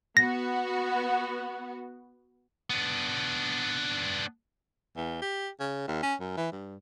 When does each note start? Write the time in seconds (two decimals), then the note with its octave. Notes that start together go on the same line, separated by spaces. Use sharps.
0.17 B3 F#4 A#6
2.70 B3 D4
4.96 E2
5.22 G4
5.60 C#3
5.88 D#2
6.03 C#4
6.20 F#2
6.37 E3
6.52 G2